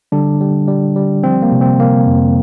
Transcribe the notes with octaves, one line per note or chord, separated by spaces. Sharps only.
D3 G3 D4
G3
G3
G3
F3 C4
A#3
C3
C4
C3 A#3
F2